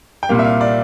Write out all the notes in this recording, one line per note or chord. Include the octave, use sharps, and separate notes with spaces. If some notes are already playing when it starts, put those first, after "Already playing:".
G5
C2 A#2 G3 A#3 F5
E5
F5
D5